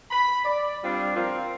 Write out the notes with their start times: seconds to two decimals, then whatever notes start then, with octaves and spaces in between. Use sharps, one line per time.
0.10 B5
0.45 D5
0.83 G3 C4 D4 F4
1.16 F3 C4 F4 A#4